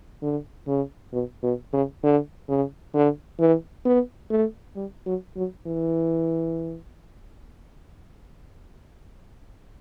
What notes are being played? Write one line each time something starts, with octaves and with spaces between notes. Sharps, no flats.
D3
C#3
B2
B2
C#3
D3
C#3
D3
E3
B3
A3
G3
F#3
F#3
E3